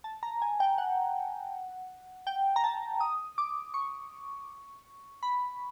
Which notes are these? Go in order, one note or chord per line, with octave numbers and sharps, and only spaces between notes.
A5
A#5
G#5
G5
F#5
G5
A#5
A5
D#6
D6
C#6
B5